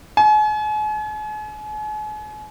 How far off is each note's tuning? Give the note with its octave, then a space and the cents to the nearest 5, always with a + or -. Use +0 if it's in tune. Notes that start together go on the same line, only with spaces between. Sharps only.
G#5 +40